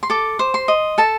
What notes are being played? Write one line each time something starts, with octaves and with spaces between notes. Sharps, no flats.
C6
A4 D6
C5
C6
D#5
A4 A5